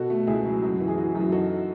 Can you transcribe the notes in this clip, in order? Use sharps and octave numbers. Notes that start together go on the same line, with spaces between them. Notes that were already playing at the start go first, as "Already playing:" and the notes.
Already playing: B2 F#4 A4
A3
C#2 E4 G#4
F#3
F#2
E3
G#4
E3 F#4
E4
F#2
F#4
D#4 F#4 A4